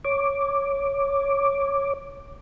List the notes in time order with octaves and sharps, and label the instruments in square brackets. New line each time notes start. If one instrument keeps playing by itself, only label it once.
[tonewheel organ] C#5 D6